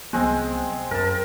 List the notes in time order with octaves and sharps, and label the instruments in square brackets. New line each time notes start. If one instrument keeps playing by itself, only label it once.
[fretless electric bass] C2 F#3 B3 [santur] G#3 C4
[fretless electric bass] F#2 [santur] A#4 A5